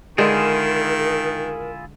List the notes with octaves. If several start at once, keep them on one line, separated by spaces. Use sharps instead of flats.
D3 D#3 G#3 E4 F4 G#4 A#4 G5